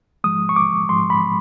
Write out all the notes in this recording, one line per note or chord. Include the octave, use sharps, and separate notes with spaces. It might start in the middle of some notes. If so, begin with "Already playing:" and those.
G#2 F3 G#3 D#6
C#6
D6
G#2 F3 G#3 C6
B5